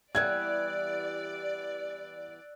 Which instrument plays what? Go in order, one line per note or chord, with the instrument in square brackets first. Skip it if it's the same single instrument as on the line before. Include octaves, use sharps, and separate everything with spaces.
[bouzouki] E3 G3 B3 [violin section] D5 [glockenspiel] E6 F#6 [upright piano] G#6